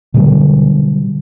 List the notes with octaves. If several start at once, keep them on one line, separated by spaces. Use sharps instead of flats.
B2 D3 F#3 G3